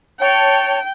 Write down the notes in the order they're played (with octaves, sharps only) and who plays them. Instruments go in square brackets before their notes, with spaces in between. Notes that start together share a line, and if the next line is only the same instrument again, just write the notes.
[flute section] C#5 A5 [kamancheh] G5